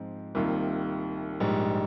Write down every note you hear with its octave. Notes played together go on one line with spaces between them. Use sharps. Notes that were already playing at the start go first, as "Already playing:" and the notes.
Already playing: G#2 F3 C4
C2 C3 D#3 A#3 F4
A#1 G#2 G3